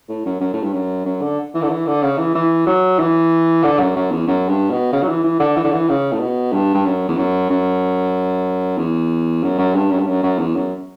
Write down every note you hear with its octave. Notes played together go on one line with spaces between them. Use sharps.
A2
F#2
F#2
A2
G2
F#2
F#2
D3
E3
D3
E3
D3
C#3
E3
E3
F#3
E3
D3
F#2
F#2
E2
F#2
G2
B2
C#3
F#3
E3
E3
D3
E3
D3
E3
C#3
A2
B2
G2
G2
F#2
E2
F#2
F#2
E2
F#2
F#2
G2
F#2
G2
F#2
F#2
E2
F#2